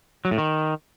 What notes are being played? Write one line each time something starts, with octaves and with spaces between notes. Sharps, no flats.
F#3
A2
D#3